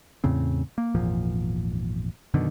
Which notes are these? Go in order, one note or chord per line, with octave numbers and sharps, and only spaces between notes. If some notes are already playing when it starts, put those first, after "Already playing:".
E2 A2 C#3 C4
A#3
G#1 E2 A#2 F3
F#2 B2 D3 D#3